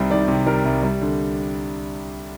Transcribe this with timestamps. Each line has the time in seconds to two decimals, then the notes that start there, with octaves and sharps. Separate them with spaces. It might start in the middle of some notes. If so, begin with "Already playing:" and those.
Already playing: C2 C3 D#3 G3 C5
0.10 D#3 D5
0.28 C3
0.47 G3 A#4
0.64 C2
0.83 G3
1.02 D3